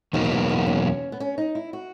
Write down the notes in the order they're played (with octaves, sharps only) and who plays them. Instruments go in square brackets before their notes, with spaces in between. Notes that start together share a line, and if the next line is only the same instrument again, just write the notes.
[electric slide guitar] E2 B2 F#3 A#3 D#4 [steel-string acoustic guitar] D#3
[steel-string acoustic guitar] D#3
E3
B3
C#4
B3
C#4
D#4
E4
F#4